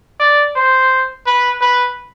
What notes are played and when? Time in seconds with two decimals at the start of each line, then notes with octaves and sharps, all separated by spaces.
0.20 D5
0.56 C5
1.26 B4
1.61 B4